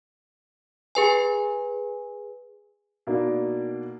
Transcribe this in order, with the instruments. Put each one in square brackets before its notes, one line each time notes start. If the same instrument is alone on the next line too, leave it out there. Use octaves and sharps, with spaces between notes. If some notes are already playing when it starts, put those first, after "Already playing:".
[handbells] G#4 B4 G#5
[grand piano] B2 A#3 D4 D#4